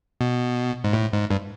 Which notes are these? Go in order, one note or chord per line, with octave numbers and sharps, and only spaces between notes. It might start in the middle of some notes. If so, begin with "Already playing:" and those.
B2
G#2
A2
G#2
G2